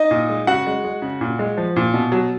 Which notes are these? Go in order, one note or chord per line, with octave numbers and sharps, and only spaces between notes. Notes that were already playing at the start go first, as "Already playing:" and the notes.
Already playing: D#4 D#5
A#2
G#3
C#3 F#4 F#5
G#3
G#3
C#3
A#2
G#3
F3
A#2
B2
F#3